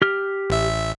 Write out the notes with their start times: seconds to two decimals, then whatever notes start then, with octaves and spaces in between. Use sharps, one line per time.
0.02 G4 F6
0.50 A1 E5